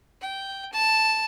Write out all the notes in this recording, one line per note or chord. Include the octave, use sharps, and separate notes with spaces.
G5
A5